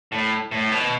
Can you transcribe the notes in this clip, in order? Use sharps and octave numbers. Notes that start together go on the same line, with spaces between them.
A2
A2
B2